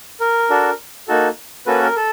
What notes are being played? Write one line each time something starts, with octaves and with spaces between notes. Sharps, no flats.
A#4
D4 F#4 A4
A#3 D#4 F#4 A4
A#3 C#4 F#4 A4 B4
A#4
A4